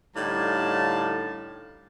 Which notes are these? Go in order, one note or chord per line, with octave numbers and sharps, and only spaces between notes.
A2 D3 G3 D#4 F5 A5